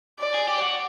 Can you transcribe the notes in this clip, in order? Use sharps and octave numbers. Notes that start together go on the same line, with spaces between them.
D5
G#4
G4
F#4